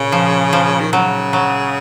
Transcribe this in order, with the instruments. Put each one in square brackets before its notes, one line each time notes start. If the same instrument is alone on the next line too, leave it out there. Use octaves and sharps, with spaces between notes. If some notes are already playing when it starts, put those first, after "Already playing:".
Already playing: [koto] A#2 [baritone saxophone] C#3
[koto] F3
F3
[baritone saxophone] D#3
[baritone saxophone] C#3 [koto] F#3
[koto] F#3